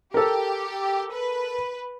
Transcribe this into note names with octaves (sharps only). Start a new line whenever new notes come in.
G4 A4 A#4
B4